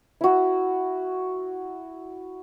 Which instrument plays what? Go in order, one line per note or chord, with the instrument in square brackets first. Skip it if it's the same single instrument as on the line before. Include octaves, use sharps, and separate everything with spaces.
[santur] E4 F#4